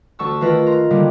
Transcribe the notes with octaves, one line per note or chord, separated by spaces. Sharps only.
D2 A5 C#6 E6
D#3 A3 F4 A#4 B4 A#6
A#5 C6
D3 D#3 G3 G#3 A#3